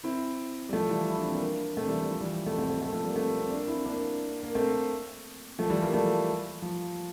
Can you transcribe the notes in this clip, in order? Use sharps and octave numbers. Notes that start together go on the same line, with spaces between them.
C4 E4
G3
F3 A3
E3 G3
E4
D4
C4
A#3 D4
A3 C4
E3 G3
G3
F3
E3 G3
A3 C4
A3 C4
A3 C4
A3 C4
F3 A3
G3 A#3
A3 C4
C4
A#3 D4
C4 E4
A#3 D4
A#3
A3 C4
F3 A3
E3 G3
G3 A#3
F3 A3
F3